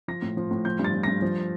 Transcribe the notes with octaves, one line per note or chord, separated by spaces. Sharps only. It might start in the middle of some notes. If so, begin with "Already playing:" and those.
F3 A#6
A2
F3
A2
F3 G6
G2
A6
F3
G2 A#6
F3